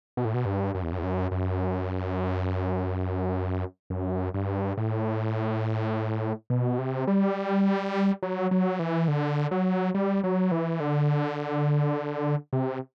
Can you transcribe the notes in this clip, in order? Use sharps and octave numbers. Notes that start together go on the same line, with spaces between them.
B2
A2
B2
G2
F#2
E2
F#2
E2
F#2
F#2
F#2
G2
A2
B2
C3
G3
F#3
F#3
E3
D3
F#3
G3
F#3
E3
D3
C3